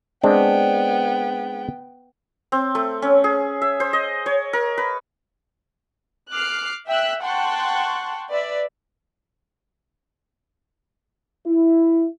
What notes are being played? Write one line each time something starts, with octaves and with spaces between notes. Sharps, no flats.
G#3 B3 C4 D4 G5
C4
A3
C#4
G#4
E5
C5
D#5
C#5
A#4
B4
D6 F6 F#6 C7
E5 G5 E6 F#6 B6
F#5 G5 A5 C6 C#6 F#6
B4 D5 E5
E4